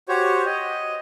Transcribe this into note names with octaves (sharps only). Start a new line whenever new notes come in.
F#4 G4 C5 C#5
D#5